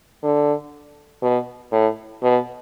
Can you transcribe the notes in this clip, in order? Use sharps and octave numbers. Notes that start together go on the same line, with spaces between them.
D3
B2
A2
B2